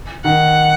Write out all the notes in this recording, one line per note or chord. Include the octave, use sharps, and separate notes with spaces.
D#3 F#5